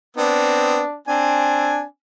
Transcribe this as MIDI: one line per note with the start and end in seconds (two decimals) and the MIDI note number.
0.17 0.82 59
0.17 0.82 60
0.17 0.97 62
1.08 1.83 60
1.08 1.85 62
1.08 1.83 80